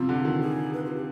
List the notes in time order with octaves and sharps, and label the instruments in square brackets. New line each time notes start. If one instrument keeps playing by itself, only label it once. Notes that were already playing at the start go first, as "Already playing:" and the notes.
Already playing: [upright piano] C3 F3 G3 [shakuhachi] F4
[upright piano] D3
D#3
[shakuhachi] G#4
B4
F4
G4